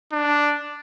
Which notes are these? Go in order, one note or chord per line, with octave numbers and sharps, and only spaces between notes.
D4